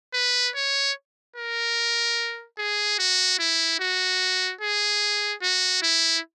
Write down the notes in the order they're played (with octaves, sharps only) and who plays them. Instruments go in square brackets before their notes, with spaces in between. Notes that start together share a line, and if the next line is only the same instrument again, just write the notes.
[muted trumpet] B4
C#5
A#4
G#4
F#4
E4
F#4
G#4
F#4
E4